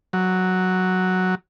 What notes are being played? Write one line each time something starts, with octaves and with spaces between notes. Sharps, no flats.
F#3